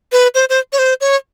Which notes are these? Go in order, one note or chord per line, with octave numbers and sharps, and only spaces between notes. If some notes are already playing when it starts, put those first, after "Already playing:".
B4
C5
C5
C#5
C5
C#5